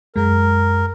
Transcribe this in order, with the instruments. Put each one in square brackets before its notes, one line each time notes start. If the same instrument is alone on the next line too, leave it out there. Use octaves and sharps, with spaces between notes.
[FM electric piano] F#2 G#3 [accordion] A#4